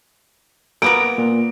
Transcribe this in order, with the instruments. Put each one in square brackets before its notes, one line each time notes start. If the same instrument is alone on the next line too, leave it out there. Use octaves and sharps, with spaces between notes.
[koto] A#3 B3 A#4 [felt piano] D7
[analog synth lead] A#2